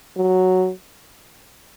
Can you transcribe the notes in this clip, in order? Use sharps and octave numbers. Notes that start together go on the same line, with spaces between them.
F#3